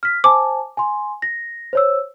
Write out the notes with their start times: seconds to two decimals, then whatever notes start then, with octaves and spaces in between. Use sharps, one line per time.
0.03 F6 B6
0.24 C5 G#5 A5 D6
0.77 G#5 C6
1.22 A#6
1.73 C5 C#5 E6